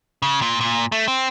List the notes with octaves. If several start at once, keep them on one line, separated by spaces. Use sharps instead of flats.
C#3
A#2
A#2
A3
C4